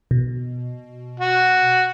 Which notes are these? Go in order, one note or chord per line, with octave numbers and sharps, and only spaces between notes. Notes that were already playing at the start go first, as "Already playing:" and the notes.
B2
F#4